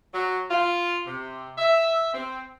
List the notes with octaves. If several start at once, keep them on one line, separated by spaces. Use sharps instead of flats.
F#3
F4
C3
E5
C4